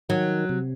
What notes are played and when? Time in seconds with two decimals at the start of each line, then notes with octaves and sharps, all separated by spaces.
0.09 D#3 F#3
0.49 C3